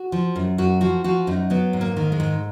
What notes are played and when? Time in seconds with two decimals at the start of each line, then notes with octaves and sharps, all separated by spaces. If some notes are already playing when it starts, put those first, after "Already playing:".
Already playing: F#4
0.12 F3
0.36 F#2
0.58 F#2 F#4
0.81 F3 F#4
1.04 F3 F#4
1.27 F#2 D#4
1.50 F#3 B3
1.73 G#2
1.81 A#3
1.96 D#3
2.12 G#3
2.20 G#2